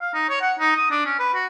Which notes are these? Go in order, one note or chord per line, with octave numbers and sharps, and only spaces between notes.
F5
D#4
C#5
F#5
D#4
D#6
D4
C#4
B4
F#4